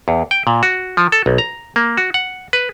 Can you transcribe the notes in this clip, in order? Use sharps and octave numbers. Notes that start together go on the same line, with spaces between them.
E2
G5
A#2
F#4
F3
A4
B1
A#5
A#3
F#4
F#5
B4